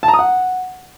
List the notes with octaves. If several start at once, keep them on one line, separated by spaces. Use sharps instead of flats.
A5
A#5
D#6
F#5